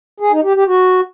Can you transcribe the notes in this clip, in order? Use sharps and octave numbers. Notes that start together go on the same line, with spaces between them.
G#4
D#4
G4
G4
F#4